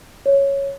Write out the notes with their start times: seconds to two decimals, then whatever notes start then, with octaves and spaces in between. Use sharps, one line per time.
0.26 C#5